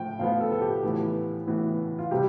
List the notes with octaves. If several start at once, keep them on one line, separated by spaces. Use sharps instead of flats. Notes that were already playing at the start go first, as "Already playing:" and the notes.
Already playing: A2 F3 G5
A2 F3 B3 F5
A4
A4
G4
A2 E3 B3
A2 E3 B3
F4
C3 G3 G4